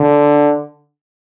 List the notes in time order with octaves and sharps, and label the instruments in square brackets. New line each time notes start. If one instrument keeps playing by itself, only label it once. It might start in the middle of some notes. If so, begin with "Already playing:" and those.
Already playing: [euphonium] D3